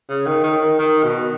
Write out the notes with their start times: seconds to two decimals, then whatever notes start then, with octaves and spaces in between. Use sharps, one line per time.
0.09 C#3
0.26 D#3
0.44 D#3
0.61 D#3
0.79 D#3
1.03 B2